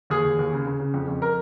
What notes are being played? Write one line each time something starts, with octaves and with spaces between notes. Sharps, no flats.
D#2 G#4
D#2
D#2
C#3
C#3
C#3
F2
F2
A#4